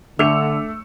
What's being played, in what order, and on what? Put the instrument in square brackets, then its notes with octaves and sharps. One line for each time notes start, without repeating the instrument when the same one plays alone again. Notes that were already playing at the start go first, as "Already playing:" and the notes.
[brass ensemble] D3 [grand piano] A3 [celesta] D4 D6 F7 [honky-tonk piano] E6 C#7 E7